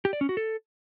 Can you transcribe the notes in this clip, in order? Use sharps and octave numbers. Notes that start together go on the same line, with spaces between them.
G4
D5
C#4
F#4
A4